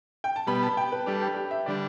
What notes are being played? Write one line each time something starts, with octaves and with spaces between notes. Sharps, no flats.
G5
A5
B2 G3 B3 B5
A5
G5
B4
G3 D4 G4 A4
G4
G4
E5
D3 G3 D4 D5